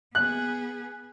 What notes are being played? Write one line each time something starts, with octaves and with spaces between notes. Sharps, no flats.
B3 G#4 F#6